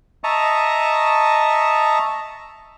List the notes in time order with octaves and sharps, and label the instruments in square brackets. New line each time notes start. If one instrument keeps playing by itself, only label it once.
[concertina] D#5 E5 A5 A#5 C#6 D#6